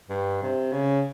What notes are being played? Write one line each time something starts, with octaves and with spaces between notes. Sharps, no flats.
G2
C3
C#3